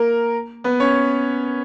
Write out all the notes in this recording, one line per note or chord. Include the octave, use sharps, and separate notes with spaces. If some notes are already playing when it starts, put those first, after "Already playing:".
Already playing: A#3 A#4
B3 B4
C#4 C#5